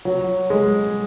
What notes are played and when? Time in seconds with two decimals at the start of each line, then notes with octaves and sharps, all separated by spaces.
0.05 F#3
0.50 G#3